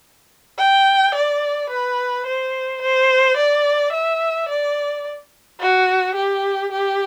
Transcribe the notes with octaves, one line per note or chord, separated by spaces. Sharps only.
G5
D5
B4
C5
C5
D5
E5
D5
F#4
G4
G4